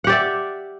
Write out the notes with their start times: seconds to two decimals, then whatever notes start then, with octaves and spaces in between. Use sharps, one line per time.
0.04 F#5
0.07 G4
0.09 D5
0.12 E5